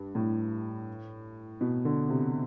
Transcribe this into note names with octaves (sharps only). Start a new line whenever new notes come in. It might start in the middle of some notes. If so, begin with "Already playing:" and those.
Already playing: G2
A2
B2
D3
C3